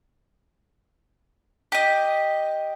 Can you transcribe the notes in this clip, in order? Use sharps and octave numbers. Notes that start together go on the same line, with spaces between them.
G4 D#5